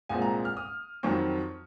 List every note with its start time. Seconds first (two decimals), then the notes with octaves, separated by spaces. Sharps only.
0.09 C2 A#2 G#3 C4 G#5
0.22 A#5
0.45 F6
0.57 D#6
1.03 F2 D#3 F#3 C4 C#6